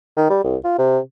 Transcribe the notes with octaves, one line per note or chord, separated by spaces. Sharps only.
D#3
G3
C2
F4
C3